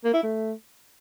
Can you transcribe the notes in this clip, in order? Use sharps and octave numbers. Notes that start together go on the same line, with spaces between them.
A#3
E4
A3